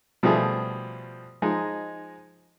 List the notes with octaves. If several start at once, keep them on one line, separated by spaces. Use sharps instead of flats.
B2 F3 G3 A3 G#4
F3 G#3 D#4